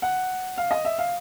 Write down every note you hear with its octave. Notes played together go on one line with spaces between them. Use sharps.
F#5
F5
D#5
E5
F5